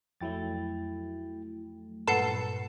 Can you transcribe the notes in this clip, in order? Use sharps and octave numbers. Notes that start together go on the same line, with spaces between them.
F2 F#3 A3 E4 G5 A6
G2 A#2 A4 B4 F#5 C7 E7